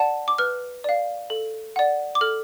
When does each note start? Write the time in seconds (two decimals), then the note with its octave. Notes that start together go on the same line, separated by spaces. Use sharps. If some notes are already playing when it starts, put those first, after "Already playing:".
Already playing: D5 F#5 A5
0.28 D6
0.38 B4 F6
0.84 D5 F5
1.30 A4
1.76 D5 F#5
2.15 D6
2.21 A4 F6